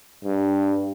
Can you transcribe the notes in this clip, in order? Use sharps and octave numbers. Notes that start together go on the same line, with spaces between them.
G2